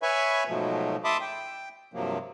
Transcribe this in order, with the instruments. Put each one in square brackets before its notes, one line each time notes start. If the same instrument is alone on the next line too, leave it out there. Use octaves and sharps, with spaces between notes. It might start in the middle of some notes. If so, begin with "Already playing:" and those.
[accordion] B4 C#5 E5 G#5 B5 C#6
G#2 B2 F3 F#3 A3
E5 A5 B5 C6 D6 D#6
G5
G2 C3 F3 F#3 A#3